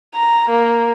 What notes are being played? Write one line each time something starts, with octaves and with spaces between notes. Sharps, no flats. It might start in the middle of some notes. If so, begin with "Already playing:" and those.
A#5
A#3